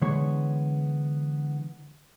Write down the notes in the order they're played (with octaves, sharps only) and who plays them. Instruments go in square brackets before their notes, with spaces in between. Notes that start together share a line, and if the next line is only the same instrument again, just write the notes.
[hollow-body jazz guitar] D3 E3 G#3 B3 C#5